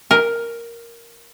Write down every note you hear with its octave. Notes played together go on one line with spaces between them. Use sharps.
A#4